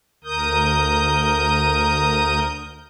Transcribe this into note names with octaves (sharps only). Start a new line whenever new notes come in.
D2 A#4 D#6 G6